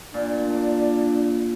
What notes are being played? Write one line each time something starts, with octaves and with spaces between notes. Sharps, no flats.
A#2 D4 D5